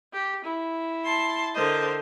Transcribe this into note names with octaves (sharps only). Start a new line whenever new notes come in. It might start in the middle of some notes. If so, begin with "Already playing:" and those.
G4
E4
A5 C6
D3 A#4 C5 D#5